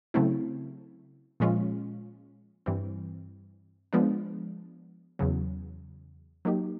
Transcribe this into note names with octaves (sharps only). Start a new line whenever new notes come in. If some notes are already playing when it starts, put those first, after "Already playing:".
C#3 F#3 A3 C4 E4
A#2 F3 G#3 C#4 F4
G2 E3 G3 C4
F3 G#3 B3 D4
E2 C#3 F#3
F#3 A#3 D#4 G4